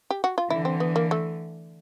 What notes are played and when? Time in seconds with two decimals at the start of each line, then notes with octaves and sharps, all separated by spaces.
0.11 G4
0.24 F#4
0.38 F4
0.50 D3 E3 E4
0.65 C4
0.80 B3
0.96 A#3
1.11 A3